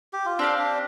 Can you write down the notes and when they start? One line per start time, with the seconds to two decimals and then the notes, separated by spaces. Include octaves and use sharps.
0.13 G4
0.25 F4
0.39 C4 D4 G4 F5
0.58 D4